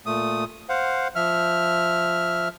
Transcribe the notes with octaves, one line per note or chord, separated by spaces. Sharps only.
A#2 A3 D#6
C5 F5 F#5
F3 E5 F6